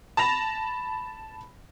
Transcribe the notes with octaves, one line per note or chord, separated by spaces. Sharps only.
A5 B5 A#6 F7